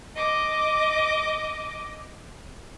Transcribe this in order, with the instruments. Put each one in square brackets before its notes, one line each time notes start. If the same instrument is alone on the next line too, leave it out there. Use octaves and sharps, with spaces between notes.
[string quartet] D#5 D6